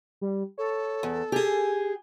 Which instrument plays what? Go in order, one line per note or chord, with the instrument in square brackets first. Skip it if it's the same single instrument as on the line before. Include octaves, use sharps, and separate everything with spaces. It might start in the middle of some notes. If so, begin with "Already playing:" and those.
[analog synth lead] G3
[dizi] A4 [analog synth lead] C#5
[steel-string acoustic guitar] E2
[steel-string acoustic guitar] G4 G#4 [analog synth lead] G#5